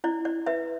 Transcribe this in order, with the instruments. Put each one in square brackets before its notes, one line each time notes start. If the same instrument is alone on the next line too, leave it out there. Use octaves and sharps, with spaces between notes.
[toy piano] E4 D5
D5
B4 E5